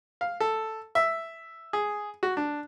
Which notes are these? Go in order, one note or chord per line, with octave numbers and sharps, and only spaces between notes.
F5
A4
E5
G#4
F#4
D4